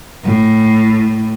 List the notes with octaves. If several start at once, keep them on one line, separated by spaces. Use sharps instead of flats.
A2